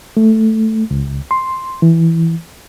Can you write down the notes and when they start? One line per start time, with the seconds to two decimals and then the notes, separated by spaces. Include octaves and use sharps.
0.17 A3
0.91 C#2
1.31 C6
1.82 E3